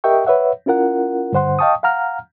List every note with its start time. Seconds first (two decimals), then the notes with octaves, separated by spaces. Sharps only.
0.04 G4 A#4 D#5 E5 G5 C#6
0.26 B4 C#5 E5 F#5
0.66 C#4 E4 F4 A#4 F#5
1.33 G2 D3 C5 F#5 C6
1.59 D#5 F5 G5 A5 C#6 D#6
1.83 F5 F#5 A#5 F6